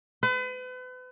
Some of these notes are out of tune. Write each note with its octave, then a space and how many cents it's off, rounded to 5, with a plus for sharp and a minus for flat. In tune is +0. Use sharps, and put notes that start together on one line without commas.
B4 +40